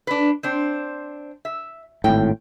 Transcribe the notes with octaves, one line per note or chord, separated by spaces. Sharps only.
D4 B4
C4 D4 C5
E5
G#1 E2 A2 G5